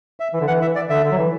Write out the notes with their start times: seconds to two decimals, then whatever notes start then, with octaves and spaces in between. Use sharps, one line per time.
0.20 E5
0.33 E3
0.41 D3
0.48 E3 F#5
0.62 E3 E5
0.76 D5
0.90 D3 E5
1.04 D3
1.11 F#3
1.18 E3